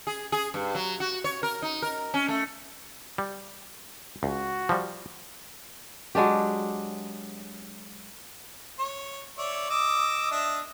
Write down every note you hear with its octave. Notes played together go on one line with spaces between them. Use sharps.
G#4
G#4
G2
F#3
F#4
C#5
A#4
D#4
A#4
C#4
A3
G3
C#2 F#4
F3 G3
F#3 G#3 D4 G4
C#5
C#5 D5 E5
D#5 D6 E6
D4 D#5 E5